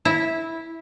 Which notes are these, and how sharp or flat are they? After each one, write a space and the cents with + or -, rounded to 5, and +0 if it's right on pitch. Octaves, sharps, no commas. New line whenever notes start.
E4 -10